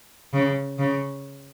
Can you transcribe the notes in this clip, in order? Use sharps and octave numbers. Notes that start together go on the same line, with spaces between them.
C#3
C#3